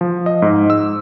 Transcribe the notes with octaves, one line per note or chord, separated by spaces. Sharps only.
F3
D#5
G#2
E6